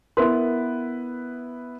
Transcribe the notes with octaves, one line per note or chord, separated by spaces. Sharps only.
B3 E4 A#4 B4 C6